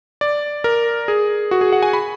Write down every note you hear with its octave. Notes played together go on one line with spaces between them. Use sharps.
D5
A#4
G#4
F#4
G#4
F#5
G#5
B5